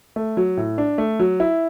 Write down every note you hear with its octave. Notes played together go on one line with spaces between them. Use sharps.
A3
F#3
A2
D4
A3
F#3
E4